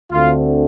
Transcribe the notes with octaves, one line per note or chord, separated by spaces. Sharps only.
D2 D3 A3 C4 F4